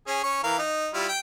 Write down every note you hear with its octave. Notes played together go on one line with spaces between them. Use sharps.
C#4 G#4
C#4 C#6
E3 A#4 F5
D#4
G3 E4 F4
G5